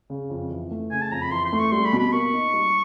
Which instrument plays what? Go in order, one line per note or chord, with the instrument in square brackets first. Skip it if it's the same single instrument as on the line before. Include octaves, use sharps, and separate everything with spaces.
[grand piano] C#3
F2
E3
A3
[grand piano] C#3 [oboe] G#5
[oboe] A5
[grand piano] F2 [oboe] A#5
[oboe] B5
[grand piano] E3 [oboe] C6
[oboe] C6
[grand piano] A3
[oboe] C#6
[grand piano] G3 [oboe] C6
[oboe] B5
[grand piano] B2
[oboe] B5
[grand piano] A#3 [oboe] C#6
[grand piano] D#4
G3